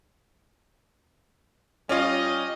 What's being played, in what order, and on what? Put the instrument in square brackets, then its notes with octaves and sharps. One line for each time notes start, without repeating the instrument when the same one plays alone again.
[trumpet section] G3 D#5 [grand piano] C#4 F4